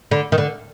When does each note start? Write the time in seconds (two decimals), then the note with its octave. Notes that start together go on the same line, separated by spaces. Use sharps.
0.11 D3
0.32 D#3
0.38 D3